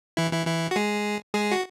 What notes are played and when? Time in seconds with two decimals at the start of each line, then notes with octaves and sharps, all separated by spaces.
0.17 E3 E4
0.32 E3 E4
0.46 E3 E4
0.71 F#4
0.76 G#3 G#4
1.33 G#3 G#4
1.52 F#4